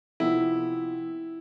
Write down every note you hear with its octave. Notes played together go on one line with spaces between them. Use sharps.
C3 F3 B3 E4